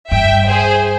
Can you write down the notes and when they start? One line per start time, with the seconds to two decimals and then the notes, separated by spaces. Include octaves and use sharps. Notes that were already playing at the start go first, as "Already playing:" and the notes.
0.11 G2 E5 G5
0.48 G#4 C5